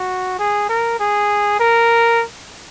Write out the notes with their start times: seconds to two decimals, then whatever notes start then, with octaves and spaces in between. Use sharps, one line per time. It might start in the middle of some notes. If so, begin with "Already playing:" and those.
Already playing: F#4
0.39 G#4
0.69 A#4
0.99 G#4
1.60 A#4